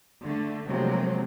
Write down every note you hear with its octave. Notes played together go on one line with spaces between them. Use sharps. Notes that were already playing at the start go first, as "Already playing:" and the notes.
D3 A3
C3 F3 F#3 G#3 A#3 C4